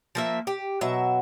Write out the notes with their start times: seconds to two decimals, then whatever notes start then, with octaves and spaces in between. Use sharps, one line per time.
0.15 F3 A#3 E5
0.47 G4
0.81 B2 F#3 E5